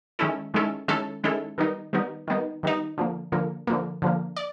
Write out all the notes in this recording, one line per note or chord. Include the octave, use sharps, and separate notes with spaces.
D#3 G#3 C#4 E4 A4
D#3 G#3 C#4 E4 A4
D#3 G#3 C#4 E4 A4
D#3 G#3 C#4 E4 A4
D#3 G3 B3 D#4
D#3 G3 B3 D#4
D#3 G3 B3 D#4
D#3 G3 B3 D#4
D3 F3 A#3
D3 F3 A#3
D3 F3 A#3
D3 F3 A#3
D5